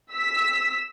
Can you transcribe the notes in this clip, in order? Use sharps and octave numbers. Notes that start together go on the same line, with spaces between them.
E6 B6